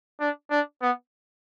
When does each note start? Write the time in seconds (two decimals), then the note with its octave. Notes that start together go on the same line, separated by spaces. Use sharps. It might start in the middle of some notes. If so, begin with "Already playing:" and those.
0.20 D4
0.51 D4
0.82 B3